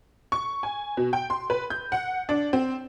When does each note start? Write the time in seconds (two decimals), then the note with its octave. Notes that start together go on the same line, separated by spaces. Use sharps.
0.32 C#6
0.63 G#5
0.97 B2
1.13 G5
1.30 C6
1.50 B4
1.70 G6
1.92 F#5
2.29 D4
2.53 C4